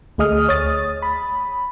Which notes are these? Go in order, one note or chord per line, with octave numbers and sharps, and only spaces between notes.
D2 A3 G#4 D#5 D#6 F6
C#5 D#6 A6
B5